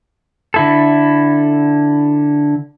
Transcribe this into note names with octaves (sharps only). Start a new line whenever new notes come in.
D3 E4 A4